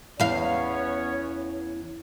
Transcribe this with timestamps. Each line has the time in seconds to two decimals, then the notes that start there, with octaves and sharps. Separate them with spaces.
0.20 E2 B3 C#4 C#5 F5